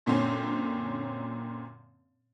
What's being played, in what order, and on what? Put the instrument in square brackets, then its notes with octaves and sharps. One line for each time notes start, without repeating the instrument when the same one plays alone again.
[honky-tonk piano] F#2 A#2 D3 C4 C#4